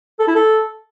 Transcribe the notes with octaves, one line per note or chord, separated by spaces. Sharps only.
A4
E4
A4